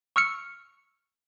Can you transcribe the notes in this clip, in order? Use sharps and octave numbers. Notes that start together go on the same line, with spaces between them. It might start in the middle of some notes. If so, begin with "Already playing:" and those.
C#6 E6 F6 C#7